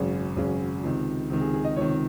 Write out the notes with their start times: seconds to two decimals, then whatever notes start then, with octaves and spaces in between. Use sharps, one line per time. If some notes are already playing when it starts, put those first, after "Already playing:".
Already playing: G#1 F#2 C#3
0.36 G#1 F#2 C#3
0.83 C#2 C3 D#3
1.30 C#2 C3 D#3
1.41 G#4
1.53 G#4
1.64 D#5
1.76 C#2 C3 D#3 C#5